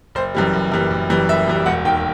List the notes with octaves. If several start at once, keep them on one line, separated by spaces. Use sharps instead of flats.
F#1 C5
F#2 E3 G3
F#1
F#2 E3 G3
F#1
F#2 E3 G3
F#1 E5
F#2 E3 G3
E1 F#5
D#2 D#3 G5